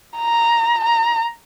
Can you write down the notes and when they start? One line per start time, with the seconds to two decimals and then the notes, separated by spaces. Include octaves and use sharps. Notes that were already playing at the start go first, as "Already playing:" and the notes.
0.18 A#5
0.85 A#5